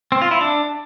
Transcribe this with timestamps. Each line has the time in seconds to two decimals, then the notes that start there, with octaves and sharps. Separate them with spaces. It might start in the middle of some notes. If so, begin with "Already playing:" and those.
0.12 C4
0.22 F4
0.31 E4
0.41 D4